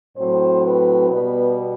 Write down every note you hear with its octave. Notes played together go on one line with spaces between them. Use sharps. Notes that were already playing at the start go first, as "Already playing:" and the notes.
A2 F#3 C4 C5
B4
B2 G3 B3 B4